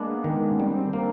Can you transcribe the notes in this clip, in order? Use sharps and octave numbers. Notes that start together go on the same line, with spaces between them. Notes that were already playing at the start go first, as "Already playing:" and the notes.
Already playing: G#3 A#3 B3 D4
D#3
C#4
G3 C4
D4
A#3